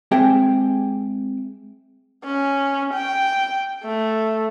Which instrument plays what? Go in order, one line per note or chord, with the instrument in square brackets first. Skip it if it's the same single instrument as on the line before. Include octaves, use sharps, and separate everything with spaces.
[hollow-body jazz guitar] G#3 C4 G4 G#4 E5 G5
[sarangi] C#4
G5
A3